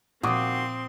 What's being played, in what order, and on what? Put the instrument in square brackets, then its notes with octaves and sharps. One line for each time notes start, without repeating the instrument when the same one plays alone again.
[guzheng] A#2 F3 [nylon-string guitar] D#3 F#4 [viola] C4 C6 [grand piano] D6 D#6